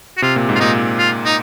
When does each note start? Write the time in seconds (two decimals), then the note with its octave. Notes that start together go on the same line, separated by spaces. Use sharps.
0.17 F#4
0.22 C3 F4
0.36 A#2
0.49 G#2
0.55 F4
0.60 A#2 D#4
0.98 F4
1.25 D#4